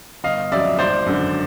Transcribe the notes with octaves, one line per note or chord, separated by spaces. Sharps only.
G1 D#5 F5
F2 C#3 F#3 D5 E5
G#1 C5 D5
F#2 D3